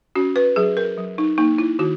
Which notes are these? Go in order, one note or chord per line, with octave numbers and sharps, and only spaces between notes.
C#4 F#4
B4
F#3 G#4
A#4
F#3
D#4
A#3 D#4
E4
D#3 F#4